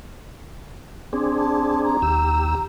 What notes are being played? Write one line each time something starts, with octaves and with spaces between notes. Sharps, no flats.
C4 D4 G#4
A5
A#5
D#2 G4 E6